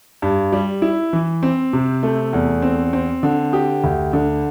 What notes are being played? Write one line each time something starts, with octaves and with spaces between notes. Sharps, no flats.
G2
G3
E4
E3
C4
C3
A3
E2
C4
C4
D3
G4
D2
D3